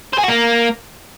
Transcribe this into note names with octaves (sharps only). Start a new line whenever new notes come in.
C5
G#4
F#4
A#3